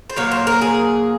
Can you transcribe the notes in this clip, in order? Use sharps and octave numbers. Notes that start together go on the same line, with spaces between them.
C5
A#2 F#3 A#3 C#5
C5
A#4
G#4